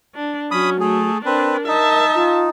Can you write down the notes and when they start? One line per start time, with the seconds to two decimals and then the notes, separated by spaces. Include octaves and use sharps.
0.15 D4
0.51 F#3 C#4 B5 D#6
0.81 A3 G#4
1.25 C4 D4 A#4 B4
1.68 D#4 E5 A5
2.14 F4